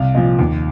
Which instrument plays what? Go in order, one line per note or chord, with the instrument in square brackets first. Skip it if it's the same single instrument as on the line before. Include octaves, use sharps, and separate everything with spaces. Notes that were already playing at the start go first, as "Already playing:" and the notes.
Already playing: [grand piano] C2 F5
A#2 F3 D#5
D#2